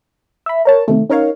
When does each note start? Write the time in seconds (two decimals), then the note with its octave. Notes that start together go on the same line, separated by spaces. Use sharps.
0.46 E5 B5
0.65 A#4 C#5 A5
0.88 C3 D#3 A3
1.10 C#4 D#4 A#4 C#5 F5